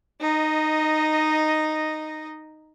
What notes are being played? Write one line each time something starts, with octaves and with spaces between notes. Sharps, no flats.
D#4 D#5